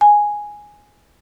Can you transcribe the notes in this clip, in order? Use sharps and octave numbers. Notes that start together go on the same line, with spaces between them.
G#5